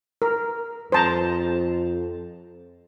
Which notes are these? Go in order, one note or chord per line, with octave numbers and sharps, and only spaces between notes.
A#4
F2 C5 A5 A#5